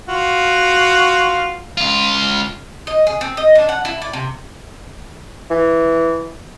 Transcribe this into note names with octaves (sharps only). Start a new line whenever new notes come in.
F4 F#4
C#2 F4
D#5
G#4
C4
D#5
D4
F#5
E4
D5
C3
E3